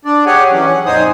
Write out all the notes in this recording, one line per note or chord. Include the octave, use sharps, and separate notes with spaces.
D4 D5
G4 G#4 C#5 F#5 G#5
E3 F#3 C#4
F#5
F2 A#2 D#4 C5 G#5 D#6